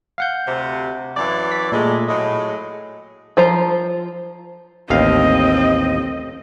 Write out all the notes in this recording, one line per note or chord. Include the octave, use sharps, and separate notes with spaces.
F5 F#5 G6
D2 C3
F#2 E3 D5
B6
G2 A#2 G#3 A3
A2 F#3 G#3 G#4 D#5
F3 C5 A#5
A1 D#2 C4 D#5 F5